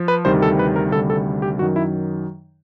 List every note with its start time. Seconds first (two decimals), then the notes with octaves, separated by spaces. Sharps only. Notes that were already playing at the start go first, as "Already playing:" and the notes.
Already playing: F3
0.08 B4
0.25 D2 C3 D#3 G3 C5
0.42 A4
0.59 B4
0.76 A#4
0.92 D2 C3 D#3 G3 A4
1.10 A4
1.42 G4
1.59 F#2 D#3 F#3 F#4
1.76 E4